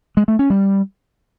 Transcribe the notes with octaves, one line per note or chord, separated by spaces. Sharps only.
G#3
A3
C#4
G3